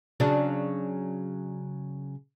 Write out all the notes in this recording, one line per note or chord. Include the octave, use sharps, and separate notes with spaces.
C#3 F#3 D4